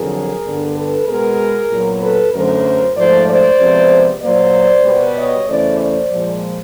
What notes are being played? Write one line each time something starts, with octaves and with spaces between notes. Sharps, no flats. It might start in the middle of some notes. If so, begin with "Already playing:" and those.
Already playing: F2 D3 F#3 G#4 A#4
G2 D3 G3 B3
A4 B4
B2 G#3 B3 G#4 A#4
A#2 F#3 B3
A4 B4
F#2 D3 F#3 A3 A#4 C5
G#2 F3 A3 C5 D5
C5 D5
C3 F3 G#3 B3
A#2 F#3 A#3 C5 D5
B2 G3 B3
C#5 D#5
E2 C#3 E3 A3 C5 D5
C5 D5
A#2 F3 G#3